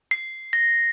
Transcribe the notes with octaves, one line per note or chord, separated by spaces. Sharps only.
C7
A#6